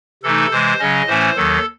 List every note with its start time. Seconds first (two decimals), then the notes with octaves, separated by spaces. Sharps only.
0.23 C3 E3 A3 D#4 A4
0.51 C3 E3 G#3 C5
0.79 C#3 F#3 C#4 D#5
1.07 A2 E3 A3 C#4 C5
1.36 D#2 D#3 F#3 A4